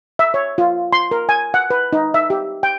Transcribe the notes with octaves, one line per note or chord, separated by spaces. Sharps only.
E5
C#5
F4
C6
A#4
G#5
F#5
B4
D#4
E5
G4
G5